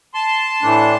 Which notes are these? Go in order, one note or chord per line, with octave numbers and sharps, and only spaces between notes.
A5 C6
A2 E3 A3 D4